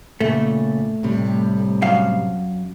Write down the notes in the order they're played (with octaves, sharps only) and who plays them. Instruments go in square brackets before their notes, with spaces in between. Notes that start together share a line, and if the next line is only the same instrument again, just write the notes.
[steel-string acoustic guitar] A#2 C#3 [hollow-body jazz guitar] A3
[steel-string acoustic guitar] A2 C3 G3
[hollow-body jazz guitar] F#2 F5